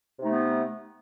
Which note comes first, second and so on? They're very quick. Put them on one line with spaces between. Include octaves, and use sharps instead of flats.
C3 D#4 A3 B3